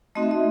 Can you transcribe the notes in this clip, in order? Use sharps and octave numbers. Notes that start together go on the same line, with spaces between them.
A3 C4 D#4 F#4 D#5
E5
D#5